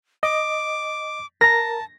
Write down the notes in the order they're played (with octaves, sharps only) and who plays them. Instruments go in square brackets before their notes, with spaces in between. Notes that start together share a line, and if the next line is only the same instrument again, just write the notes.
[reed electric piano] D#5 [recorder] D6
[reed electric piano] A#4 A#5 [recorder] A5 [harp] A#6